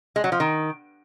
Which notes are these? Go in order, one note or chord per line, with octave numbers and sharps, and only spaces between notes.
G#3
F#3
F3
D#3